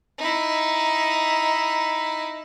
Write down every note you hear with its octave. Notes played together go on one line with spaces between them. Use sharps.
D#4 E4